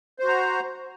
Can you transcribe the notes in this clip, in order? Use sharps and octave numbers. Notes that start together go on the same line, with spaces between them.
F#4 C5 A#5